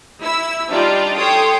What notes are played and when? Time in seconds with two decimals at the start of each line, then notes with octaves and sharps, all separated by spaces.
0.21 E4 E6
0.69 G3 D4 D#4 F4 D5
1.17 A4 C#5 G5 C6 D#6